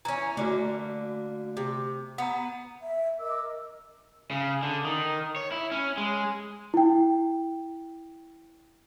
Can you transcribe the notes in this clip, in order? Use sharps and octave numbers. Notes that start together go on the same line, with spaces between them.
E3 C#4 A#5
D3 A3 A#3 F#4
C3
B3 F#5 A#5
E5
A#4 D#5 D6 E6
C#3
D3
D#3
C#5
E4
C#4
G#3
E4 G5